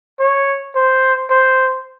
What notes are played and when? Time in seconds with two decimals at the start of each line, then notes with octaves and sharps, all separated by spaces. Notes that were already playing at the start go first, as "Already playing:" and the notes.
0.20 C#5
0.75 C5
1.30 C5